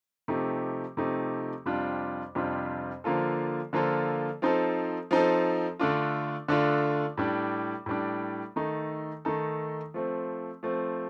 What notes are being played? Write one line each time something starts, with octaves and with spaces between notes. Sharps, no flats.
C3 F3 A3 D#4 G4
C3 F3 A3 D#4 G4
F2 C3 G3 D4 F4
F2 C3 G3 D4 F4
D3 F3 A#3 F4 A4
D3 F3 A#3 F4 A4
F3 C4 D#4 A4
F3 C4 D#4 A4
D3 A3 D4 F4
D3 A3 D4 F4
A2 G3 D4
A2 G3 D4
D#3 A3 D#4 A4
D#3 A3 D#4 A4
F3 A3 C4
F3 A3 C4